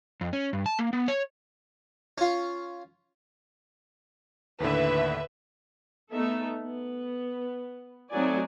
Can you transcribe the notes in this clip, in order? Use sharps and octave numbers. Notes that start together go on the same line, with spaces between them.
F2
C#4
G2
A5
A#3
B3
C#5
C#4 F4
D#2 A2 D3 B4 E5
A3 B3 D#4 A4 E5
B3
F#3 A3 C4 D#4 D5 G#5